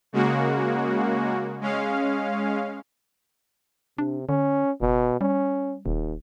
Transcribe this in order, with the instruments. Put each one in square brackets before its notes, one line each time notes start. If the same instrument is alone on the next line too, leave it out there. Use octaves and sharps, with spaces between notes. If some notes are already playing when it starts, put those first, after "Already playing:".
[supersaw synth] C#3 G#3 A#3 F#4
G#3 C#4 F5
[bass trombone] C3 [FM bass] D4
[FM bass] D3 [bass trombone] C#4
[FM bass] F#1 [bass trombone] B2
[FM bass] G3 [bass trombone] C#4
[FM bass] D#1 [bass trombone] D#2